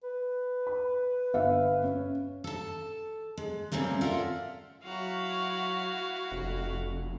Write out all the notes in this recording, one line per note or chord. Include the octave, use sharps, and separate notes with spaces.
B4
B5
G1 E5 F5
C#4
A4 A5
G#3
G3 A3 A#3 C4 C#4
F4 A4 A#4 D5 E5 F#5
F#3 E4 F#4 F5
F1 F2